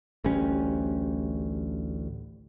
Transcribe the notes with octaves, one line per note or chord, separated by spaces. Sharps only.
A1 D2 G3 C#4